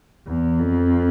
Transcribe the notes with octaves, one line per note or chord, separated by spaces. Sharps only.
E2
F2